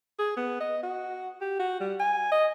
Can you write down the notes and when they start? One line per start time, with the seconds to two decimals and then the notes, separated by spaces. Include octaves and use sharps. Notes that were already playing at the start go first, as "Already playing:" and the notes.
0.19 G#4
0.37 B3
0.61 D#5
0.83 F#4
1.41 G4
1.60 F#4
1.80 G3
2.00 G#5
2.32 D#5